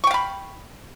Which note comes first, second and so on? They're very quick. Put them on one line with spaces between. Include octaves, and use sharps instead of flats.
C#6 G5 F5 B5